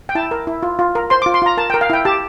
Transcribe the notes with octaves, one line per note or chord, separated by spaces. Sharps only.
G5
E4 A5
A#4
E4
F4
F4
A#4
C5 C6
D6
F4
C6
F4 A#5
A#4 A5
G5
A#4
F5
E4 G5
G4 A5